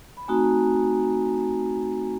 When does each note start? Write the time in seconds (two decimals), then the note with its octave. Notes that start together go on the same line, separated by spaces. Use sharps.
0.17 B5
0.28 A3 C4 D#4 F#4 G#5 A#5